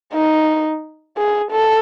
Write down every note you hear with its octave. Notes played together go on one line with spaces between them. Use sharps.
D#4
G#4
A4